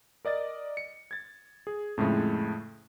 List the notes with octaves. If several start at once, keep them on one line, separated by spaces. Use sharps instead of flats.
A#4 D5 D#5 A6
C#7
G#6 A6
G#4
F2 A2 C#3 G#3 A3